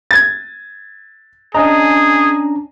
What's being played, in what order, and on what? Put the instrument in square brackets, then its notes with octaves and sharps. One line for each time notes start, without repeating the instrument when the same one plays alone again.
[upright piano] G#6 A6
[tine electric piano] C#4 D4 A#5 [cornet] G#4 [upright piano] D#5